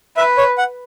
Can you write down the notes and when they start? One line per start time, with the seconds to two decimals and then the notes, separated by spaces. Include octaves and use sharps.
0.17 B4 E5
0.38 C#5
0.58 F#5